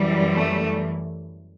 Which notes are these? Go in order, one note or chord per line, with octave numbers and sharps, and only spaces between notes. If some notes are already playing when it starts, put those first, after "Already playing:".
Already playing: F#2 E3 G3
A3